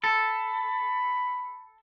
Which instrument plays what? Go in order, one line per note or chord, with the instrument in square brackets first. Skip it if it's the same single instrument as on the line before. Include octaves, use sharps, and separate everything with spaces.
[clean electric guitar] A4 [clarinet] B5